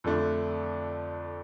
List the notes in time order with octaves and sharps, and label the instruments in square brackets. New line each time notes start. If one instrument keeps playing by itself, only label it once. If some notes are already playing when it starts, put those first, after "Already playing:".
[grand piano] F2 D3 A3 D4